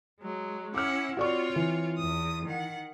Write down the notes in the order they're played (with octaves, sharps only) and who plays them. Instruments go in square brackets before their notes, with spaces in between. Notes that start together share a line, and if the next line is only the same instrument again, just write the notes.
[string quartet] F#3 G#3
[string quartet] C#4 E4 F#5 [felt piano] D6 F6
[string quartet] C4 F4 C#5 [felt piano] F#4 D5 C#6
[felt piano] E3
[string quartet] E2 D#6
D#3 F#5